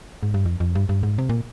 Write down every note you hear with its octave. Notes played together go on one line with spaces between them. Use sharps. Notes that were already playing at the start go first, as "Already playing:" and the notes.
G#2
G2
F2
F2
G2
G2
G#2
C3
A#2